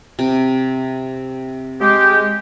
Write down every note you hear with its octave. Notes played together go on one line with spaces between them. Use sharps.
C3
G#3 G4